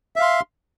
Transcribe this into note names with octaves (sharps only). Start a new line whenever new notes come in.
E5 F5 C6